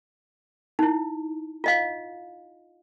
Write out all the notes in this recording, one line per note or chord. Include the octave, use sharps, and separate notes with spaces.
D#4 E4
F4 D#5 F5